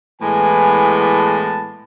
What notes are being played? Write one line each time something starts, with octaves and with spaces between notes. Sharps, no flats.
A2 E3 G#3 B3 G#5
A5